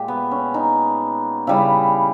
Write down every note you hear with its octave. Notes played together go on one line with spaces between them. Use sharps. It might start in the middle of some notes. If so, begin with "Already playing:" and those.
Already playing: A#2 G#3 G4
B3
C#4
D#4
C#3 G3 E4